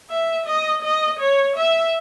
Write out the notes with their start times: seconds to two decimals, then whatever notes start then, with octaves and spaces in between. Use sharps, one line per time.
0.10 E5
0.46 D#5
0.83 D#5
1.20 C#5
1.57 E5